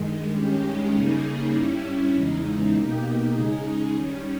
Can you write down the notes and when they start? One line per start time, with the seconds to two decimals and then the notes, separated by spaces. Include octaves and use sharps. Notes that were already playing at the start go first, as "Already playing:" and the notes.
Already playing: G2 D#3 G#3
0.33 G2 D#3 G#3 C#4 G4
0.93 C#3 G3 A#3 D#4 G#4
1.53 G2 G3 C#4 E4
2.13 E2 C#3 E3 G#3 D#4
2.73 B2 A#3 D#4 G4
3.33 C#3 G#3 D#4 G#4
3.93 D#3 G3 C#4